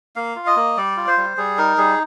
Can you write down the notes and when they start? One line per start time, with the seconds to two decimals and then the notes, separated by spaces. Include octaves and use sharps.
0.16 A#3 F5
0.36 F4
0.46 D#5
0.56 A#3
0.77 G3 D5
0.97 F4
1.07 C5
1.17 G3
1.37 G3 G#4
1.58 D#4 A#4
1.78 G3 G#4